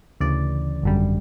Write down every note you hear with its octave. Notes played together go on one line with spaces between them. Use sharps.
D2 C#3 E3 D5
G#1 F#2 D3 G3